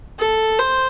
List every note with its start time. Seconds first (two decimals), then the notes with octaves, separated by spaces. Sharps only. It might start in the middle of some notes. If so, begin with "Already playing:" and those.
0.19 A4
0.59 C5